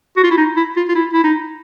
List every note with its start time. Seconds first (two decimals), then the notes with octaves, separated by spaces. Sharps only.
0.17 F#4
0.23 F4
0.31 E4
0.38 D#4
0.57 E4
0.77 F4
0.88 F4
0.95 E4
1.13 E4
1.24 D#4